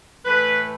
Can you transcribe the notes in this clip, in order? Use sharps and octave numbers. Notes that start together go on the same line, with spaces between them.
A2 E3 A3 B4